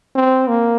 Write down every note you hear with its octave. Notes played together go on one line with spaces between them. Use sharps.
C4
A#3